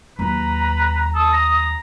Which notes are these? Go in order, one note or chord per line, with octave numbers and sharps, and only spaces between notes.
D#2 F#3 B4 A#5
A4 D#6
A#5